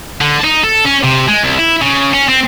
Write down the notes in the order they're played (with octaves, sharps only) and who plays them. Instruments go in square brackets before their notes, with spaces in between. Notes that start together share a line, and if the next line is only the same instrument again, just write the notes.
[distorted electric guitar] D3
D#4
A4
C#4
C3
G#3
C2
E4
C#3
C#4
C4